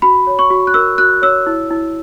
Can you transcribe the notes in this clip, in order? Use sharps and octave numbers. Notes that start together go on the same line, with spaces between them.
F#4 B5
C#5
C#6
F#4
F#6
A#4 E6
F#4 F#6
C#5 E6
E4
E4